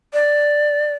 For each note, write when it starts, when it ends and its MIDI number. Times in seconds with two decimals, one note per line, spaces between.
0.13 0.94 74